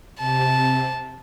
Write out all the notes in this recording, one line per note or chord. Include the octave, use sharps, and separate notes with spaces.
C3 A5